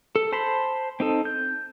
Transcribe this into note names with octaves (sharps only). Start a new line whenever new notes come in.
A4
C5 A5 B5 C6
C4 D#4 A4
G6